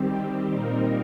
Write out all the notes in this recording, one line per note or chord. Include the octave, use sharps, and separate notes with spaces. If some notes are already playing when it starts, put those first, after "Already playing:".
Already playing: D#3 G3 C4 G4
A#2 G3 C4 D#4 A#4